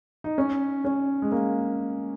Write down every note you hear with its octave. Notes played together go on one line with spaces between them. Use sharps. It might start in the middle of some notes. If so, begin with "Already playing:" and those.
D#4
C#4
C#4
G#3
A#3